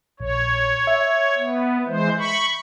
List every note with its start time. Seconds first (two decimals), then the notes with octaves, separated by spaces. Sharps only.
0.20 A#1 C#5
0.87 E5
1.38 B3
1.87 E3 G#3 C5
2.18 B5 C#6